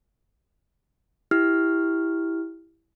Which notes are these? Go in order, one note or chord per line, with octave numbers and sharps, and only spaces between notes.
E4 G4 F6